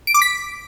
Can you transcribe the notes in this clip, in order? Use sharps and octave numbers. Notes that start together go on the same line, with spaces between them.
D7
D6
B6